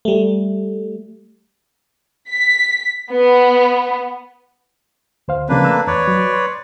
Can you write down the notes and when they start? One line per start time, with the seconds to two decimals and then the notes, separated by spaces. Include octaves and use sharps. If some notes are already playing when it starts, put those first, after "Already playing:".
0.05 G3 A3
2.29 B6
3.10 B3
5.28 D2 C5 F5
5.49 C#3 F3 A#3 C4 D4 B4
5.65 A3 A#5 E6
5.87 E2 B4 C#5 D5
6.08 F#3
6.34 C6